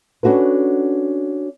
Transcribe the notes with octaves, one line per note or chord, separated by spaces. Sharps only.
C#4 D4 F#4 A4 B4